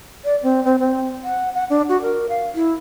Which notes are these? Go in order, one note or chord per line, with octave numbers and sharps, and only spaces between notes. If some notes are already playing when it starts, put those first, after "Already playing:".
D5
C4
C4
C4
F#5
F#5
D4
F#4
A#4
F5
E4